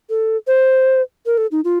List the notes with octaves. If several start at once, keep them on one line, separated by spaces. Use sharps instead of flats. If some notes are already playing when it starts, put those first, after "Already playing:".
A4
C5
A#4
A4
D#4
F4